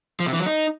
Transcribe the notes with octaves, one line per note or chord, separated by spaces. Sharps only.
F3
C3
E3
F#3
D#4